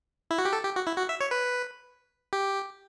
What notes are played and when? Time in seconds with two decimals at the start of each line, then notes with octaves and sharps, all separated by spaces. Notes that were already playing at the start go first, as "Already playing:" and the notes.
0.31 E4
0.38 F#4
0.45 G4
0.53 A4
0.64 G4
0.75 F#4
0.87 E4
0.98 F#4
1.09 E5
1.21 C#5
1.31 B4
2.33 G4